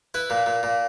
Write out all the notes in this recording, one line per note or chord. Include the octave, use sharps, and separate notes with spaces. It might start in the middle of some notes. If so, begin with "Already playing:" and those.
E4 B4
A#2
A#2
A#2